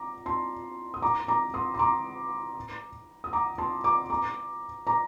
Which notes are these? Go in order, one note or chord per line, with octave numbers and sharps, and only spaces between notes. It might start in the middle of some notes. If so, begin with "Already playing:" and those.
Already playing: A#5 D6
A5 C6
D#6
A#5 D6
A#5 D6
C6 D#6
C6
A#5 D6
D#6
A#5 D6
A5 C6
A#5 D6
A#5 D6
A#5 D6